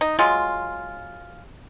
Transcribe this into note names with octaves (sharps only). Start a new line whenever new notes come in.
D#4
F#3 G#3 F4